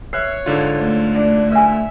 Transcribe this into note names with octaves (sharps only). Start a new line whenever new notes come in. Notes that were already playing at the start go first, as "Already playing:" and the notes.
B4 C#5 E5 F#6 C7
G#2 D3 F4
A3
D4
B4 E5 G#5